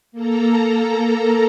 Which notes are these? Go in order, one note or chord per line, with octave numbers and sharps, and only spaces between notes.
A#3 A4 A#5